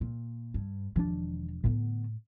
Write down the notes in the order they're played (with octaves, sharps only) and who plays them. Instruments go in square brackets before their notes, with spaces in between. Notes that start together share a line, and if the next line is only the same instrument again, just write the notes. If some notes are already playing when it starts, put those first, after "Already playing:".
[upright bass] A#2
G2
[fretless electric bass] E1 F3 D4 [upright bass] D#3
[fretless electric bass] A2 [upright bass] D3 B3